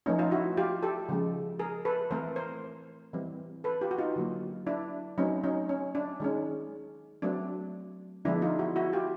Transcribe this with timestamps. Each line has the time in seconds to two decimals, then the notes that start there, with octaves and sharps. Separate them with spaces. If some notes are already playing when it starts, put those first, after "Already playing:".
0.06 F3 A3 C#4 D#4
0.19 D#4 F4
0.31 E4 F#4
0.57 F4 G4
0.83 G4 A4
1.09 C#3 F3 G#3
1.59 G#4 A#4
1.85 A4 B4
2.11 E3 A3 C4 A#4 C5
2.36 A#4 C5
3.13 E3 G3 C4
3.64 A4 B4
3.81 F4 G4
3.91 F#4
3.98 D#4 F4
4.16 D3 F#3 A#3
4.66 D4 E4
5.18 F#3 A3 C4 C#4 D#4
5.44 C#4 D#4
5.69 C#4
5.95 D4
6.20 D#3 G#3 C#4
7.22 F#3 A3 C4 D4
8.25 D3 F3 G#3 B3 D4 E4
8.42 D#4 F4
8.59 E4 F#4
8.76 E4 F#4
8.93 F4 G4